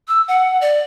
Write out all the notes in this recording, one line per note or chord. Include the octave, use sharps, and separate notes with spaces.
E6
F#5
D5